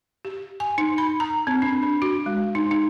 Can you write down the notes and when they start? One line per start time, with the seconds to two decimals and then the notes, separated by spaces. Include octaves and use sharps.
0.25 G4
0.60 G#5
0.78 D#4
0.98 B5
1.20 A#5
1.47 C4
1.62 D4
1.83 D4
2.02 F#4
2.26 G#3
2.55 D#4
2.71 D#4